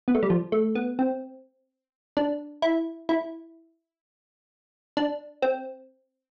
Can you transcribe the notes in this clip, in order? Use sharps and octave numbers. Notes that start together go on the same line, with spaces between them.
B3
A3
G3
F3
A3
B3
C4
D4
E4
E4
D4
C4